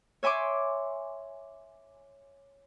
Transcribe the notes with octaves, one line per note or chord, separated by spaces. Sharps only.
C#5 E5 G#5 C6 D6